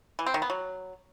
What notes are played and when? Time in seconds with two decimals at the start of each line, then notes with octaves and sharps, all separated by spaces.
0.19 E3
0.26 C4
0.34 D#3
0.42 B3
0.50 F#3